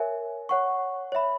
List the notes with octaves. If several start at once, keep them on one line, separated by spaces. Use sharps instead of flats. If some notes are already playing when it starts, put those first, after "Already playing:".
Already playing: A#4 C#5 E5 G#5
C#5 F#5 C#6
C#5 E5 B5